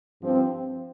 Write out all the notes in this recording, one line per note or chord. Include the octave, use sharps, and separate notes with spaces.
G2 F3 C4